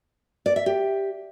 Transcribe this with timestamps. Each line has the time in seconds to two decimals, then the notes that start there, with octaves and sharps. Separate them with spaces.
0.46 D5
0.56 E5
0.66 G4